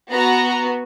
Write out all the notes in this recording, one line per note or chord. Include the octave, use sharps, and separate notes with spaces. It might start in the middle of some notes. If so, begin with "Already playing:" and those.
B3 F#4 A#5